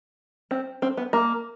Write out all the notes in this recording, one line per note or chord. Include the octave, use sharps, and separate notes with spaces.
C4
C4
B3
A#3